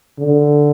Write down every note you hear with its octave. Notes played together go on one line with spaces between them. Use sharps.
D3